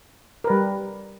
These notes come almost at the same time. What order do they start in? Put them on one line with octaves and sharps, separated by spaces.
A#4 B4 G3